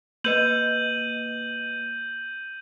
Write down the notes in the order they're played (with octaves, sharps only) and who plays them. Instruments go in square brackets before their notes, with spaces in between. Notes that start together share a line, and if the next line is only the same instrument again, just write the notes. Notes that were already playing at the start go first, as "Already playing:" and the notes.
[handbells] A#3 B4 D#5 [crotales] G6 D#7 F#7